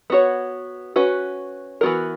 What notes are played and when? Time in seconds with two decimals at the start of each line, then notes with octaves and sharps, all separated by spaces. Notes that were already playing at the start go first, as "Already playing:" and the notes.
0.10 B3 F#4 C#5
0.96 C#4 F#4 B4
1.81 E3 B3 F#4 A#4